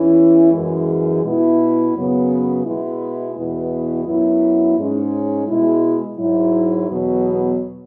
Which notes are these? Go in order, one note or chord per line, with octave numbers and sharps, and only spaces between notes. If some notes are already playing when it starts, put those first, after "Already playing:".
Already playing: E2 E3 C#4 E4
F#2 E3 G#3
B2 B3 E4
F#2 C#3 F#3 B3
B2 G#3 B3 E4
E2 B2 B3 E4
F#2 F#3 B3 E4
G#2 G#3 C#4
B2 G#3 E4
G#2 F#3 E4
E2 B2 F#3 B3